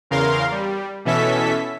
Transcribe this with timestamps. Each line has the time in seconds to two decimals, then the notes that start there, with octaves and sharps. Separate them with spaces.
0.11 E2 C#3 A#4 F5 C6
0.51 G3
1.05 B2 E3 C#4 A4 E5 B6